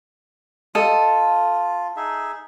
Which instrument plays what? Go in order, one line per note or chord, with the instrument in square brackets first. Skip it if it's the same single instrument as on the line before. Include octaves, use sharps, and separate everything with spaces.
[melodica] F4 [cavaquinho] A4 D#5
[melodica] D#4 G#4 E5